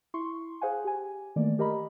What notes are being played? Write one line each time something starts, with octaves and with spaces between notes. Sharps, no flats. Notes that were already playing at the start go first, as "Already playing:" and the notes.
E4 C6 C#6
G#4 C5 F5 F#5 G#5
G4 G#5
D#3 E3 A3 A#3 D5
G4 A#4 D#5 A#5 B5